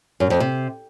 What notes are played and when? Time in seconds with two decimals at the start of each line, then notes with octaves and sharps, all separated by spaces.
0.20 F#2
0.30 F2
0.40 C3